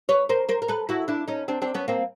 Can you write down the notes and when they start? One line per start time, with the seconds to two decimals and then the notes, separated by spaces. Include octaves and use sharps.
0.09 B4 C#5
0.29 A#4 C5
0.49 A#4 C5
0.62 A#4
0.68 A4 B4
0.89 E4 F#4
1.08 D4 E4
1.28 C#4 D#4
1.48 C4 D4
1.62 C4 D4
1.74 B3 C#4
1.88 A#3 C4